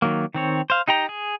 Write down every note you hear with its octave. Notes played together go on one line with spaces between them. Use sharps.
D#3 F#3 A#3
D#3 C4 C#5
C5 F5
D#4 G4 G5 A#5
G#4